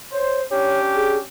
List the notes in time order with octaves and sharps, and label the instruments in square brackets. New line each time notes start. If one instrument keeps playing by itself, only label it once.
[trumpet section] C5 [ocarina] C#5
[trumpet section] C#4 D4 G4 [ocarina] C#5
[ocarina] G#4